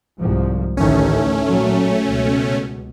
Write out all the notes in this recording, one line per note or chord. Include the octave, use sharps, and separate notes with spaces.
C2 G#2 F3
A1 D2 D#3 A3 C#4
A#2 F#3
C#2 B2